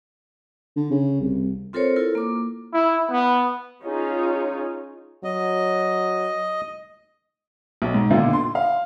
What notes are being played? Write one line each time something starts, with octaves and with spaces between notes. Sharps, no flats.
D3
C#3
C2
C4 F4 A4 A#4 C5 C#5
E4 F4 A4 A#4
A#3 D6
E4
B3
C#4 D#4 F4 G#4
F#3 D#5
B1
G#2
A#2 D3 D#3 B3 D4 F4
C6
F5